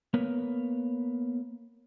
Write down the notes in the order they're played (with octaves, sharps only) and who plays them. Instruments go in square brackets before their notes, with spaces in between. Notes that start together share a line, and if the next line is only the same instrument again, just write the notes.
[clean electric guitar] A#3 B3 A#4 B4 C#5